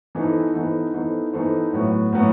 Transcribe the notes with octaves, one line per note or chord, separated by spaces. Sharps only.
E3 B3 D#4 A4 C5
E3 B3 D#4 A4 C5
E3 B3 D#4 A4 C5
E3 B3 D#4 A4 C5
A2 F#3 B3 F#4
A2 F#3 B3 F#4